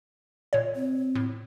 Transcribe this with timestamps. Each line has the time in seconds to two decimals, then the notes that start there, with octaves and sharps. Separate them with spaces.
0.53 A#2 C#5
0.76 C4
1.15 A2